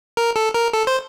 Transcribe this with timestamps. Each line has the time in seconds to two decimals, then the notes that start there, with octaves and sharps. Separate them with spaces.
0.17 A#4
0.36 A4
0.54 A#4
0.73 A4
0.87 C5